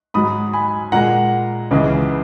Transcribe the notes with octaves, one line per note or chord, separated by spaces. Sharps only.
G#2 F#3 B5 D#6
G#5 B5
A#2 G#3 F#5 A#5
C#2 C#3 E3 G#3